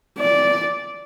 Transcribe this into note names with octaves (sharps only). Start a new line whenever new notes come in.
D5